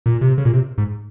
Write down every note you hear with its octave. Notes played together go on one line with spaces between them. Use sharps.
A#2
C3
C#3
A#2
C3
G#2